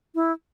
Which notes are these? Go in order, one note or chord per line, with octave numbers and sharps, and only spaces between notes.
E4